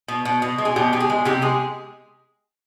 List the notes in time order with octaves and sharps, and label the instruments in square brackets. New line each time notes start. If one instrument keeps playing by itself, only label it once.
[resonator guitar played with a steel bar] B2
B2
B2
G#3
G#4
B2 G4
B2 G4
G#4
G#3
C3 G4
G#3 G#4